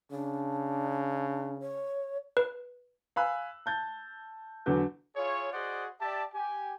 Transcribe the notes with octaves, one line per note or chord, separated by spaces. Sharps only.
C#3 D4
C#5
B4
F5 G#5 B5 E6 F#6
A5 G6 A6
E2 D3 F#3 G6
E4 F4 G#4 C#5
F#4 G#4 C5 D5 D#5 F#5
G4 D5 E5 A5
G4 G#5